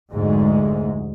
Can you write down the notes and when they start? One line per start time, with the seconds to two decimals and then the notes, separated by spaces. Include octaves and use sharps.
0.12 F1 D2 G#2 G#3